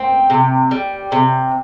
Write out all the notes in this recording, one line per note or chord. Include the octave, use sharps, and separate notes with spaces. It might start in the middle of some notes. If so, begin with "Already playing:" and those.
Already playing: C4 G5
C3
G3
C3